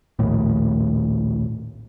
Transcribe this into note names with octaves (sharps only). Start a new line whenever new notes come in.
A#1 D#2 A2